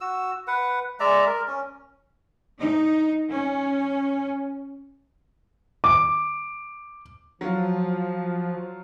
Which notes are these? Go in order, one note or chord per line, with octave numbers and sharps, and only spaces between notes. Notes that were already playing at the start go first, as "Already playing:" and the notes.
F#4 E6
B4 F#5
G#3 D5 E5 A#5
A#4
C#4
D#4
C#4
D6
F3 F#3 F4